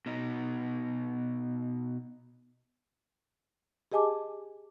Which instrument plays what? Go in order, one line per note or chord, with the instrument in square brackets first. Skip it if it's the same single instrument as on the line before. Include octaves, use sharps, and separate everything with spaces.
[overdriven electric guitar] B2 D#4
[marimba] G4 G#4 D#5 G#5 A5 D6